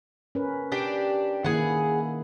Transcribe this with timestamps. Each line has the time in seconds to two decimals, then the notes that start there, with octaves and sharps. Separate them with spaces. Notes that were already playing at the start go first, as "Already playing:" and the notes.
0.35 C#4 A#4 B4
0.72 D4 G4
1.44 D#3 A#3 E4 G#4 F#5